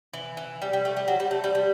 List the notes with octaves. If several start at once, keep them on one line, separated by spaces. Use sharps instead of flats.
E3
E3
G3
G3
A3
G3
F#3
G3
A3
G3
G3